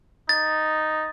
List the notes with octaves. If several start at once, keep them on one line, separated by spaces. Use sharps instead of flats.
D#4 A6